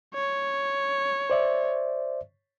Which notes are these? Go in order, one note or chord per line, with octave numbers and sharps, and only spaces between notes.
C#5
C5 D5 E5